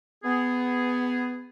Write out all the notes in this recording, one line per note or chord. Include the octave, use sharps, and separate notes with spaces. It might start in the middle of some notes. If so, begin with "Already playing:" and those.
B3 G#4